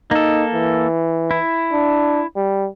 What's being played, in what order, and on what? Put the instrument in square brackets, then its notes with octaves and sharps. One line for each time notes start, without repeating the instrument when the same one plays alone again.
[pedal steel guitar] A#3 A4 [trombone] D#4
[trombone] E3
[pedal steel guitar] E4
[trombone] D4
G3